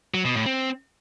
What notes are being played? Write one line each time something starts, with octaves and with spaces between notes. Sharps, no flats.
F#3
B2
A2
C4